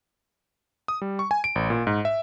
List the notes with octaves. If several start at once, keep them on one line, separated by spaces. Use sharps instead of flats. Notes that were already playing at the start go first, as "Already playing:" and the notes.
D#6
G3
C#6
G#5
D7
A1
A#2
G#2
E5